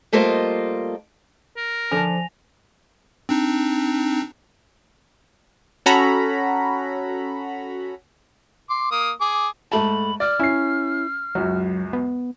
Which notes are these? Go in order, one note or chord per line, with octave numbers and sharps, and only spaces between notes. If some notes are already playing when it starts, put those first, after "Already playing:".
G3 A3 A#3 F4 C5 D#5
A#4
D3 F3 G#5 A5 A#6 F7
C4 D4 D#4
C#4 F#4 A4 A#5 B5
C6 D6
A#3 D#6
G#4 D6
G#2 A3 A5 B5
D5 F6
C#4 E4 C7
C#2 F#2 F#3 F#4
B3